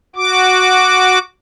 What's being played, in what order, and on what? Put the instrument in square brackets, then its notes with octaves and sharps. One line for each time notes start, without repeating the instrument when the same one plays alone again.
[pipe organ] F#4 D6